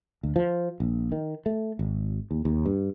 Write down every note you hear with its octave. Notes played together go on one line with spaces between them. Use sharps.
D2
F3
A#1
D#3
A3
G#1
D#2
D#2
G2